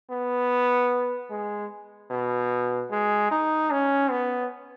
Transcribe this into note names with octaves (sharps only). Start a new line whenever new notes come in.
B3
G#3
B2
G#3
D#4
C#4
B3